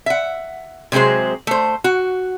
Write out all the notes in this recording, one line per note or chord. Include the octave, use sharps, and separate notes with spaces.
E5 F#5
C3 F#3 G#3 G#4 C5
A3 C5
F#4